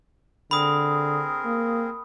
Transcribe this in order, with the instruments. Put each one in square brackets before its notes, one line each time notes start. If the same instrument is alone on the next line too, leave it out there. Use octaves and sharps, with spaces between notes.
[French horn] D3 [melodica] C4 G#4 A#4 [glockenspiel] B5 D#6
[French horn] A#3